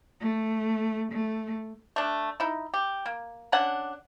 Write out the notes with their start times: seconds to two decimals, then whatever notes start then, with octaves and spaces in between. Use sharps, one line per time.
0.20 A3
1.12 A3
1.96 A3 D4
2.40 D#4 E4
2.74 G4
3.06 A#3
3.52 D3 C#4 D4 F#5